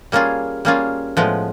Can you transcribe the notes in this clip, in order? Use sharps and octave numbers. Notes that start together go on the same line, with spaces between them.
G3 A#3 C#4 F4 G#4
G3 A#3 C#4 F4 G#4
A2 F3 G#3 B3